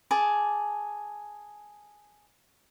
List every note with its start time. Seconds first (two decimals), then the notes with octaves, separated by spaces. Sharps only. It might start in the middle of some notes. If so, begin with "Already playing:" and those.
0.11 G#4 A5 D6